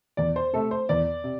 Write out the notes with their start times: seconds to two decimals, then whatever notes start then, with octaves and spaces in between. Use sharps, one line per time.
0.17 E2 D5
0.36 C5
0.53 C3 A3 A4
0.71 C5
0.89 E2 D5
1.24 C3